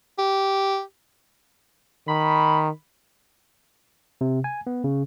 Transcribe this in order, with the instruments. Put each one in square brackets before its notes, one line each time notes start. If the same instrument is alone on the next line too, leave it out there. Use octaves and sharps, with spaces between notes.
[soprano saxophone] G4
[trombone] D#3 [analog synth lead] B5
[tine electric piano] C3
G#5
B3
C#3